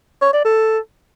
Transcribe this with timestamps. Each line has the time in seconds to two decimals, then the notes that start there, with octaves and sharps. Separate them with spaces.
0.22 C#5
0.33 D5
0.45 A4